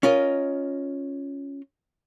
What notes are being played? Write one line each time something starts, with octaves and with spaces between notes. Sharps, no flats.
C#4 F4 A#4 D#5